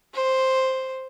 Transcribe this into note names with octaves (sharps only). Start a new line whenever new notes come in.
C5